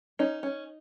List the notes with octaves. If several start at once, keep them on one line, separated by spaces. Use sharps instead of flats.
C#4 D#4
C#4